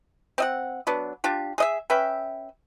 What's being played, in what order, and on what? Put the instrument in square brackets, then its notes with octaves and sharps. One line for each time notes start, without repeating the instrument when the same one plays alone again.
[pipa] C4 D#5 F#5
F#3 B3 D4
D4 F4 G4
G#4 D#5 E5
C#4 B4 E5 G5